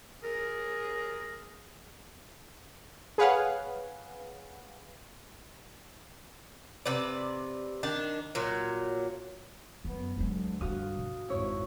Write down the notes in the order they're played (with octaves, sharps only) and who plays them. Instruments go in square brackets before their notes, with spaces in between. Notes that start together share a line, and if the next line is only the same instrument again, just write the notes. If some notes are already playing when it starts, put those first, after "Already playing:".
[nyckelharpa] G#4 [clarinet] A#4
[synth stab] G#4 B4 C#5 F5 F#5
[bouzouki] C3 B4 D5
D#3 D4 A5
A#2 F#3
[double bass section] F#2 B3 [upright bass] D3
[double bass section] D2 D3 [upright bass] F#3 G#3
[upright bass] G2 F3 [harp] F#4 F5 D#6
[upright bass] B2
[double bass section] G#1 F2 [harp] E4 C#5